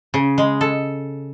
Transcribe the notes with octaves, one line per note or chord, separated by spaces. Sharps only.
C#3
G#3
A4